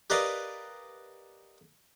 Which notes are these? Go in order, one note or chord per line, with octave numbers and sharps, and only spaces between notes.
G4 A#4 B4 D5 D#5 F5